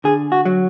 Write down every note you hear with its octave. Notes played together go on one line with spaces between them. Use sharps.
D3 G#4
F#4
F#3